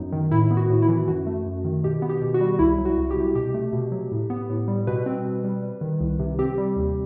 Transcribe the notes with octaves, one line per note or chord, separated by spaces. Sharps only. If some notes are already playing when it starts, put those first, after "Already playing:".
Already playing: F#2 F#3 B3 D#4
D#3
A2 E4
B3
F#4
A2
E4
E3
F#2 F#4
A3
F#2
D#3
B2 G4
B3
G4
B2
F#4
G3
F#4
C2 E4
F#3
F#4
C2
G4
C3
B2 G4
A3
B2
F#3
A2
B3
A2
G3
B2 B4
C4
B2
G3
G3
D#3
C2
C3
C4 G4
G3
D#2